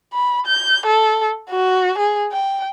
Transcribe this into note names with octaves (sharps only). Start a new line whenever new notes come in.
B5
G6
A4
F#4
G#4
G5